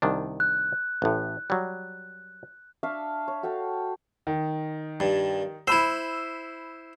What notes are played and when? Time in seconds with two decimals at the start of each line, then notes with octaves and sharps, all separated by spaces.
0.02 C2 D#3 D4
0.40 F#6
1.02 A1 A2
1.50 F#3 G3
2.83 D4 E5 F5 C#6
3.28 C#5
3.43 F#4 A4 F5 G5
4.27 D#3
5.00 G2
5.67 E4 C5 B5 E6